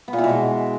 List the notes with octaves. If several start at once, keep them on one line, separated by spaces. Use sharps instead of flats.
B3
A#2
E3
B2
G#3